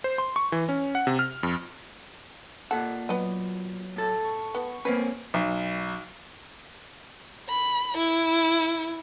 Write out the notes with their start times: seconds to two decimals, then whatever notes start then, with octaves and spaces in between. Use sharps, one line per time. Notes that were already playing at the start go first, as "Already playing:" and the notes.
0.04 C5
0.18 C6
0.36 C#6
0.52 E3
0.69 C#4
0.95 F#5
1.07 C3
1.19 F6
1.43 F2
2.71 A#2 A4 F#5
3.09 F#3 B3 D#5
3.96 A2 A4
4.24 C#6
4.55 B3
4.85 A#3 C4 C#4 B4
5.34 B1
7.49 B5
7.97 E4